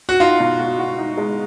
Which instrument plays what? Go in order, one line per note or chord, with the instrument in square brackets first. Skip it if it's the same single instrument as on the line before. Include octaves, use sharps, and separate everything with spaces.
[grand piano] F#4
[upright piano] D#4 [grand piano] F4
[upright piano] B2
F#4
F#4
D#4
G#3